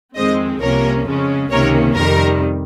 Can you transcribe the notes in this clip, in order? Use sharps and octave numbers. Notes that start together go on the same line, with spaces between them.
F2 D#3 G#3 C4 C5 D#5
C2 C3 F3 A#3 C#4 A#4 C#5
F2 C#3 G#3 C#4
C#2 C3 D#3 A#3 C#4 A#4 C#5
F2 C3 D#3 G3 A#4